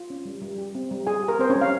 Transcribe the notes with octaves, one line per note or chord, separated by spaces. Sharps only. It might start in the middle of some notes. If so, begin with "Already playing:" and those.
Already playing: F4
C#4
G3
G3
G4
C4
G3
G3 G#4 G#5
G4
A#4 A#5
C4 C5
C#4 C#5
G3
F5